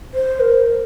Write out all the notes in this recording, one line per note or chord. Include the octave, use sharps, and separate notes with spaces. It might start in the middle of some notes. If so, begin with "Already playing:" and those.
C5
A#4